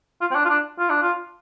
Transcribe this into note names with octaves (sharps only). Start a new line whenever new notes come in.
F4
C4
D4
F4
D4
F4
D4
F4